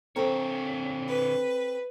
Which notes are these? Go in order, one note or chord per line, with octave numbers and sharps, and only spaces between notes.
D3 C4 A4 A#4 C#5
B4